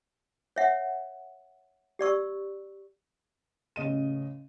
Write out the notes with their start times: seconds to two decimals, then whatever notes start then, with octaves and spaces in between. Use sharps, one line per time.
0.56 C#5 E5 F#5
1.99 G4 D5 C#6 E6
3.76 A1 C#3 D#5 D#7